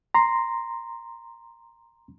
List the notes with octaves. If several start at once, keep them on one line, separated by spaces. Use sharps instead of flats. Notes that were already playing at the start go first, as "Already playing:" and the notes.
A#5 C6